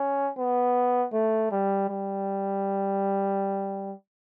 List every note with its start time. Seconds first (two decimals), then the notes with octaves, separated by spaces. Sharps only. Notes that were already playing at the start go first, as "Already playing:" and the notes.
Already playing: C#4
0.38 B3
1.13 A3
1.51 G3
1.89 G3